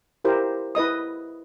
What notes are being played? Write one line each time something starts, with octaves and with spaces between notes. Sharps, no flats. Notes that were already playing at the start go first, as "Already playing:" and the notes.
E4 G4 A#4 C5
E4 B4 D#5 D#6